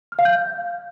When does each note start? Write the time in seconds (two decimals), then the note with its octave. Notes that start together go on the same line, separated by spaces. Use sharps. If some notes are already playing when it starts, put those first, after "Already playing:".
0.12 F6
0.19 F5
0.25 G6